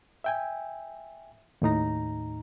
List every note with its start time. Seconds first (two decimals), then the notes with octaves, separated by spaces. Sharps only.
0.24 E5 G5 G#5
1.62 D#2 A2 D#4 A#5